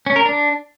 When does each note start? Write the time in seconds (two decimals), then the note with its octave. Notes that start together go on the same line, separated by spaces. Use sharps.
0.06 C#4
0.16 A#4
0.25 D4